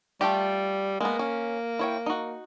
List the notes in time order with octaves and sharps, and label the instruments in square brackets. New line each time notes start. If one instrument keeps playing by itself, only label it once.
[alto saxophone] G3 [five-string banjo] A3 F4 G4
[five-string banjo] G#3 B3 [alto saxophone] A#3
[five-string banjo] C#4
E4 C#5 G5
D#4 F#4